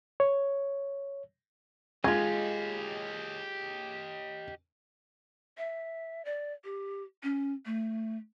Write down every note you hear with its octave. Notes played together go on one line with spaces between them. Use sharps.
C#5
G#3 F4 G4 D#5 G#6
E5
D5
G4
C#4
A3